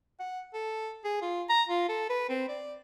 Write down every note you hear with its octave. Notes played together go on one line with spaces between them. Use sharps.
F#5
A4
G#4
F4
A#5
F4
A4
B4
C4
D5